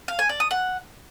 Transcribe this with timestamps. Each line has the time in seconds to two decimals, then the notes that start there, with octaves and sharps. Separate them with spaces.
0.08 F5
0.19 G#5
0.29 D5
0.40 D#6
0.51 F#5